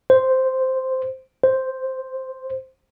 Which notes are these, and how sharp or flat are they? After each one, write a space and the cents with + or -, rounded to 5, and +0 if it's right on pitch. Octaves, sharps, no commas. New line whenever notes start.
C5 -5
C5 +0